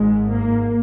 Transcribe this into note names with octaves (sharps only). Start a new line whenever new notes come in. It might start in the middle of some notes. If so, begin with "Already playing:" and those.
Already playing: G#1 G#2 G#3
A#3